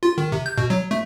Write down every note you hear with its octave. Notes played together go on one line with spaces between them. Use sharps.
F4
D#3
C3
G6
B2
F#3
A3